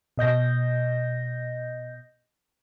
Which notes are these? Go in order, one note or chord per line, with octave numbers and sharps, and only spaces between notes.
B2 D#5 G6 A#6